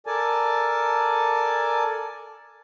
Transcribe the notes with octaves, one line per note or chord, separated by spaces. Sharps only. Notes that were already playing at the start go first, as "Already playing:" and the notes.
A4 A#4 D5 G#5 A5